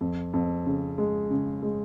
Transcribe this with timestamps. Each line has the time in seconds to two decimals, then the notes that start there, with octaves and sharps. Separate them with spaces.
0.01 F2
0.34 F2
0.66 C#3
0.98 G#3
1.31 C#3
1.63 G#3